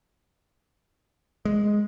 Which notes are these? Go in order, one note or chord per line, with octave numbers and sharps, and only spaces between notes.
G#3